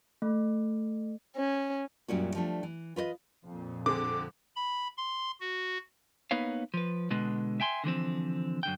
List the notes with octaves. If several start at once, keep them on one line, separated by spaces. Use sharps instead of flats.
A3
C#4
F#2 A#2 G3 C#4 E4 F#4
F3 G3 A3 D4
E3
F4 B4 C5 D#5
F2 A#2
D3 C4 G#4 D6
B5
C6
F#4
A#3 B3 D#4 B4 C#5 F5
F3 B4
B2 D3 G#3 B4
E5 G5 G#5 C6
D3 E3 F3 C4
F#2 D3 G5